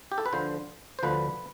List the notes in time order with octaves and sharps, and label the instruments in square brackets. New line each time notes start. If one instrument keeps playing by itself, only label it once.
[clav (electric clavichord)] G4
A4
B4
D2 D3 F3 C5
C5
D2 D3 F3 B4